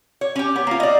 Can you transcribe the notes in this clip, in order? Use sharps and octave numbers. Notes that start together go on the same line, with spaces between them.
C#5
C#4 G4
B3
A#3 F4
D5 D#5